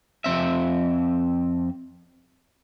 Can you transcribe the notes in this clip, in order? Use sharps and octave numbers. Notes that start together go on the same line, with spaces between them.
F2 C4 E5